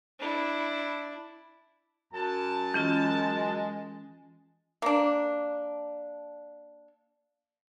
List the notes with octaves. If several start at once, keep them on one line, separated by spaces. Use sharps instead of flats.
D4 E4
F#2 A5
E3 G#3 C#4 F4
A#3 D4